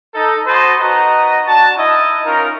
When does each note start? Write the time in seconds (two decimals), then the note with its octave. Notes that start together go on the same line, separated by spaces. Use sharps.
0.14 D#4 A4
0.46 F#4 C5 D#5 A5 B5
0.79 D#4 F#4 B4 D#5 A#5
1.46 D4 F#4 A5
1.77 D#4 E4 D#5
2.25 C#4 D#4 F4 A#4